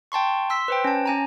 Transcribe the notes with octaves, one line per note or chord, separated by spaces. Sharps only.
G5 A5 C6 C#6
C6 E6 B6
B4 C5 G5
C#4 A5
C#4 G#5 A#5